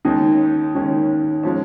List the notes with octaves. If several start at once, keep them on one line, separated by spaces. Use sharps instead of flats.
D#2 D#3 G#3 C#4 D#4
D#2 D#3 G#3 C#4
F3 G#3 C#4